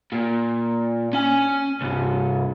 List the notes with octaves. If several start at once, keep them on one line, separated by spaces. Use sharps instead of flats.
A#2
C#4 G#5
C2 G2